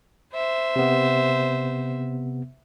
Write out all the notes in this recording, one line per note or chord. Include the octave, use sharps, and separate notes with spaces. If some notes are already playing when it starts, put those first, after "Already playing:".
C5 E5
C3 B3